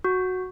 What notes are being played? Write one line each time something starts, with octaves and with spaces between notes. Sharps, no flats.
F#4